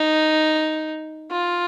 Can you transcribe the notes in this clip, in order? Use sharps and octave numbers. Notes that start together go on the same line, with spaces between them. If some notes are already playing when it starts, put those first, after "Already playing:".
Already playing: D#4
F4